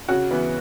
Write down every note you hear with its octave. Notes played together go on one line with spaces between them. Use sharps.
C#3 F#4
E3 B3